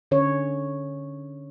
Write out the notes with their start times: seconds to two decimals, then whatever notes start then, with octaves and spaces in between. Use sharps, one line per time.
0.11 D3 C#4 C#5